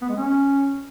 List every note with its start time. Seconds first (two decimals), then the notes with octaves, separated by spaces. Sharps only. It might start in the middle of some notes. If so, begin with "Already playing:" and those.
0.02 B3
0.09 G#3
0.16 C#4